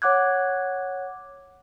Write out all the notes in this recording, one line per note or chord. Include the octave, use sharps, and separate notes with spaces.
C#5 F#5 D6 F#6 G#6